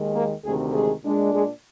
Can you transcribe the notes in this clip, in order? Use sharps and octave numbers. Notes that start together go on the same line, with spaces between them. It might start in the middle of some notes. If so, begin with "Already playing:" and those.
Already playing: D#2 D#3 G#3 D#4
A#3 A#4
D2 C3 D#3 G#3 G#4
G#3 G#4
A#2 G#3 D4
G#3 G#4